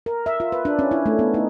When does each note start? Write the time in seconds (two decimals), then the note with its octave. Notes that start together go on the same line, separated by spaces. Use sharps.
0.06 A#4
0.26 E5
0.40 F4
0.52 B4
0.65 D4
0.79 C#4
0.91 E4
1.06 A3
1.19 B3
1.34 D#4